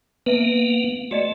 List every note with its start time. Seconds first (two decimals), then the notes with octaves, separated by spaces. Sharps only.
0.26 A#3 B3 B4 E5
1.11 A3 F#4 D5 D#5